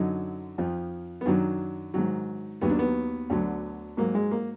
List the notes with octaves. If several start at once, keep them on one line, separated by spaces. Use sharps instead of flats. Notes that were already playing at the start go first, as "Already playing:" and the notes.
Already playing: F#2 D3 F#3 D#4
F2 F3
B3
F#2 D#3 F#3 D4
G#2 D#3 F#3
D#2 D#3 F#3 B3
D4
B3
D2 D3 F#3
G#2 F#3 A#3
G#3
A#3